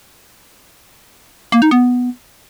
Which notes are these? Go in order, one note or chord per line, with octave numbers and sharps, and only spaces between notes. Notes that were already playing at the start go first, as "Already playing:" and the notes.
A#3
D#4
B3